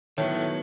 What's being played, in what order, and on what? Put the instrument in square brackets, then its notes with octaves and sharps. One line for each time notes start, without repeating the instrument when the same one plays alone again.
[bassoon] A2 [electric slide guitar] D#3 F#3 B3